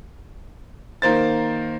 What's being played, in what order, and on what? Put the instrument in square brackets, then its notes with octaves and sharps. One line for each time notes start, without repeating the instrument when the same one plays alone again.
[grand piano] D#3 A#3 C5 A6